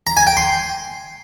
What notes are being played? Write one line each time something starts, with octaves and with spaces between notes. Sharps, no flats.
A#5
G#5
G5
C6